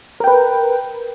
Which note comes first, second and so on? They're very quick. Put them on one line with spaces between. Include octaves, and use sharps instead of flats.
A#4 G5 B4